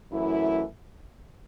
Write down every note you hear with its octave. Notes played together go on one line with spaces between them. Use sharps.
F#2 E3 A3 E4